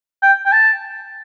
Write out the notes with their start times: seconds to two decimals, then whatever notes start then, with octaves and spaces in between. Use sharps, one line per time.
0.22 G5
0.46 G5
0.52 A5